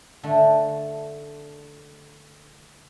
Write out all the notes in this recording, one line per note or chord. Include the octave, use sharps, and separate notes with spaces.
D3 A3